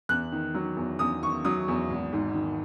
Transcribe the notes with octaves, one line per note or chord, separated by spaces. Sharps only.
E2 F#6
D#3
F#3
E2
E2 D#6
D#3 C#6
F#3 D#6
E2
G#1
G#2
D#3